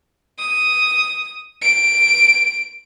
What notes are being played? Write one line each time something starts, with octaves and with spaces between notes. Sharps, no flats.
D#6
D7